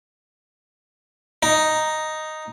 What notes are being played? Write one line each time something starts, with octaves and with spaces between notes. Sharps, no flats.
D#4